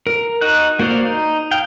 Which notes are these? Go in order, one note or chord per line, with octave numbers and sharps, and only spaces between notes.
A#4
D#4 F#4 D#5 F#6
A#3 F#4 C5 D5 F5
D#4
F5 G5